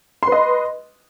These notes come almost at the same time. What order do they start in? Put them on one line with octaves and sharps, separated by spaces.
C6 B4 D#5